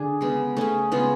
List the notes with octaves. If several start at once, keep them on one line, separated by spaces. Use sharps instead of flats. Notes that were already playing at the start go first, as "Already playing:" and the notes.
Already playing: D3 D4 G#4
C#3 G#3 B3
A3 C#4 G#4
C#3 G#3 B3 F4